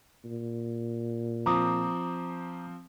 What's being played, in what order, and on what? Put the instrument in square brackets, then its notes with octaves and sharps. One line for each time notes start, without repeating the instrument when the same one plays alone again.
[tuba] A#2
[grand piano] F3 C4 [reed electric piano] A#5 D6 D#6